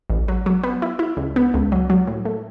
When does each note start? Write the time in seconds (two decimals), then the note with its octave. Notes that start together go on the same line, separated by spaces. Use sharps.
0.10 A1
0.28 F#3
0.46 F#3
0.63 B3
0.82 E4
0.99 E4
1.17 C#2
1.36 B3
1.54 C#2
1.72 F#3
1.90 F#3
2.07 A2
2.25 A3